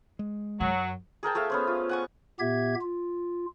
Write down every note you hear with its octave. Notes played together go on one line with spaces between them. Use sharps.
G#3
F#2 F#3
G#4 A#4 G5 A5
A3 G#4 E5 F5
B3 C#4 C5
F4
F#5 G#5 C#6
A#2 B3 G4 E5 G#6
F4